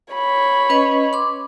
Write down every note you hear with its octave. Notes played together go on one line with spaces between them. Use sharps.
C#5 B5
C#4 B4 D#5
C6 D6